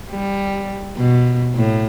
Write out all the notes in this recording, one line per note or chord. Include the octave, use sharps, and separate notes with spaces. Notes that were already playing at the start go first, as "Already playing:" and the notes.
G3
B2
A2